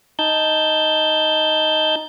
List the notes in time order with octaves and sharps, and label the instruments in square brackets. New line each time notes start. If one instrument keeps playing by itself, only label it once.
[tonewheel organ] D#4 A5 G6